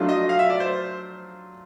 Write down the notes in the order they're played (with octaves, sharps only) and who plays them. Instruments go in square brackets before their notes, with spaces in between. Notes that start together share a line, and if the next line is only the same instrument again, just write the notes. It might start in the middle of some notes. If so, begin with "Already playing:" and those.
Already playing: [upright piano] F#3 A3 D4 F4
[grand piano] D#5
F5
E5
D5
C5